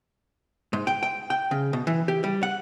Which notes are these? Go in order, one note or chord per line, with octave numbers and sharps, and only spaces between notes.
G#2
G5
G5
G5
C#3
B2
E3
G4
G3
F#5